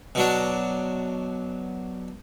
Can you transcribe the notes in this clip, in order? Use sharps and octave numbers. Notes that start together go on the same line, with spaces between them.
B2 F#3 D4